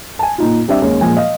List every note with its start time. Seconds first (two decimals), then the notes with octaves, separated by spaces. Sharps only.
0.19 G#5 A5
0.38 A#2 D#4 F4
0.68 G3 C4 D4 D5 E5
0.82 D#2 G#3 C#4
1.01 A#2 F3 G#3 G#5
1.17 D#5 F5